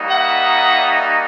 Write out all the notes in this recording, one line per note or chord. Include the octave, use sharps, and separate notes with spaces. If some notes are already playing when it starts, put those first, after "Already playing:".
Already playing: G3 A#3 D#4 F#4
E5 F#5